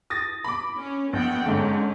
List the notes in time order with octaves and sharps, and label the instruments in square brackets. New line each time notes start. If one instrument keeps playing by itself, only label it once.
[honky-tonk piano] D#6 A6 A#6
B5 D6
[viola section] C#4
[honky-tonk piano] A#1 [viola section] B3 F#5 G5
[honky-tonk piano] G#2 D3 [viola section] C#4